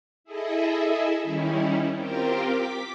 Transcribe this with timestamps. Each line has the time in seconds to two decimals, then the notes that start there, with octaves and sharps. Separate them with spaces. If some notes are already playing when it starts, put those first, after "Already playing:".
0.24 E4 G#4 A4 D#5 E5
1.23 D#3 G3 C#4 D#4 E4
1.95 C4 F4 G4 A#4 G5
2.42 D6 B6